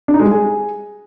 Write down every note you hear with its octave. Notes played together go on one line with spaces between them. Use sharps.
D4
D#4
G#3
G3
G#4